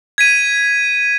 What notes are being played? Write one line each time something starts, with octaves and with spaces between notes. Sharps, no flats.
G#6 B6 D#7